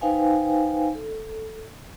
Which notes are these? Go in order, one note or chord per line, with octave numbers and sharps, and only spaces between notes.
D#4 B4 C5 F5 G5 G#5
A4